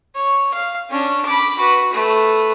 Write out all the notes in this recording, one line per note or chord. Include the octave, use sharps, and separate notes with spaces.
C#5
F5
C#4 D4
B5 D6
F#4 B4
A3 B4